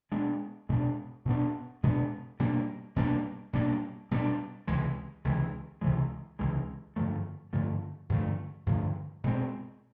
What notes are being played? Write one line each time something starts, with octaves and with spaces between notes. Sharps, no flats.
B2 G#3 B3 D4
B2 G#3 B3 D4
B2 G#3 B3 D4
B2 G#3 B3 D4
B2 G3 A#3 D4
B2 G3 A#3 D4
B2 G3 A#3 D4
B2 G3 A#3 D4
C#2 C3 E3 G#3
C#2 C3 E3 G#3
C#2 C3 E3 G#3
C#2 C3 E3 G#3
G2 D3 F3 A3
G2 D3 F3 A3
G2 D3 F3 A3
G2 D3 F3 A3
B2 G#3 C4